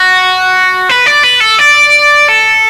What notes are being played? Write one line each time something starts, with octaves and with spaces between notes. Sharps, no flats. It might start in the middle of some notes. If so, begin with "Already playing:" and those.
Already playing: F#4
B4
D5
B4
A4
D5
A4